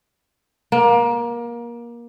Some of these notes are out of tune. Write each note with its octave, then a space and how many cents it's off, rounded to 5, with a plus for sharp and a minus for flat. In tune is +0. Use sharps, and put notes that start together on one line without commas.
A#3 +25